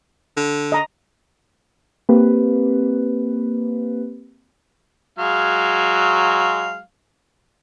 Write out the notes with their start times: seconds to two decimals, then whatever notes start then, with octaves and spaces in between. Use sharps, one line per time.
0.37 D3
0.72 D#5 A#5
2.09 A#3 C4 G4 B4
5.19 F#3 G#3 F5